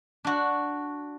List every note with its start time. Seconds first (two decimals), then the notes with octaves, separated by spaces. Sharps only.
0.24 D4 F#4